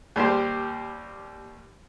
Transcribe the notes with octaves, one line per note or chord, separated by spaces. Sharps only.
D#2 G3 G4 C5